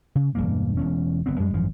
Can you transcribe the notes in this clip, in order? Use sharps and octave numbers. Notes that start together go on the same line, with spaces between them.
C#3
E1 E2 G2 A#3
E1 E2 C#4
F#1 B3 C4
F#2 G3 G#3
G#1 F#2 E3 F3